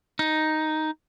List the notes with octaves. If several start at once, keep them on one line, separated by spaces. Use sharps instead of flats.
D#4